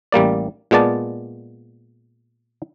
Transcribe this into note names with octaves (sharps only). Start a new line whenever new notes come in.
A1 G3 A#3 D5
A#2 G#3 B3 D5 A5